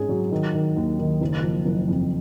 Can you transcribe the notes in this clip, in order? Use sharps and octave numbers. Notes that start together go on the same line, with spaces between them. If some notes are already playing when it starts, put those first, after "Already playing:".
Already playing: G#2 C#4 G#4
F#3
D#3
D#3
D#2
D#3
F#1
F3
F#1
F2